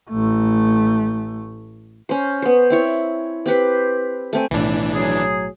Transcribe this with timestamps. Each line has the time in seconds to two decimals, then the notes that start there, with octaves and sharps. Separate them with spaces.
0.10 A1 A3
2.09 C#4 C5
2.42 B3 C5
2.70 C4 E4 C#5
3.46 C4 G4 B4 C5
4.33 A3 C4 G#5
4.51 B1 A2 E3 D4
4.94 F#3 G#4